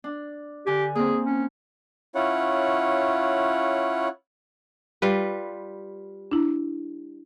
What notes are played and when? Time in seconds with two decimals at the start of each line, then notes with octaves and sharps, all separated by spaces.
0.04 D4
0.67 D3 G4 G#5
0.95 A#3 C4 G#4
1.26 C#4
2.15 C#4 E4 F4 C#5 F#5
5.02 G3 F4 B4
6.31 D4 E4